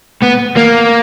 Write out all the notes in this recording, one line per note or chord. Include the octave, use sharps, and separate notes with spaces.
B3
A#3